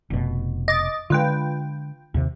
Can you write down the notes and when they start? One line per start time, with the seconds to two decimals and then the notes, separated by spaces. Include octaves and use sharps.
0.10 F1 B2
0.68 D#5 D6 A6
1.10 D3 G#3 F4 B4 G5
2.14 D#2 C3